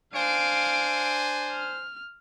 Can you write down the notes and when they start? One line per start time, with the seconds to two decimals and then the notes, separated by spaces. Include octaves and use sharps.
0.14 D4 C5 F5 G#5 D7
1.52 F6